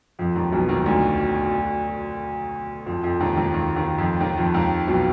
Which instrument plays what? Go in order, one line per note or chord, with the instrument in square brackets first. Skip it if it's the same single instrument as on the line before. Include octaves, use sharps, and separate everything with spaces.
[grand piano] F2 F3
D#2 D#3
B1 B2
D#2 D#3
D2 D3
F2 F3
F2 F3
D#2 D#3
D#2 D#3
D#2 D#3
D#2 D#3
F2 F3
D#2 D#3
F2 F3
D#2 D#3
B1 B2